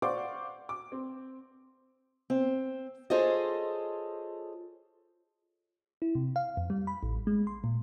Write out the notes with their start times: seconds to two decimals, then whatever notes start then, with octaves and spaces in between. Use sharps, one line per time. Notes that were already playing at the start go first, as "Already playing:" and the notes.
0.02 C5 D5 F5 F#5 C#6 D6
0.69 D6
0.92 C4
2.30 C4
3.10 F4 G#4 A4 C5 C#5 D#5
6.02 E4
6.15 C3
6.36 F5
6.57 F2
6.70 G3
6.87 B5
7.03 A1
7.27 G#3
7.47 C6
7.64 A#2